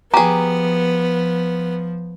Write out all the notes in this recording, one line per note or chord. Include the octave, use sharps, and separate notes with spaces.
F3 B3 G4 G#4 A#5